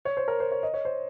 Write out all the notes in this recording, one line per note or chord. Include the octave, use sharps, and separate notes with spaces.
C#5
C5
A#4
C5
C#5
D#5
C#5
C5